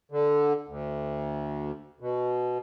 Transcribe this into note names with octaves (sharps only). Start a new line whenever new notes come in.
D3
D2
B2